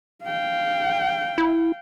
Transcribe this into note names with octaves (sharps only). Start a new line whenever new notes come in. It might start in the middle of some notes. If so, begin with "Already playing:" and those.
F5 G5
E4